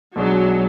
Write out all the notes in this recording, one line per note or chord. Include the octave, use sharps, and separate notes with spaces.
B1 B2 F#3 G#3 D4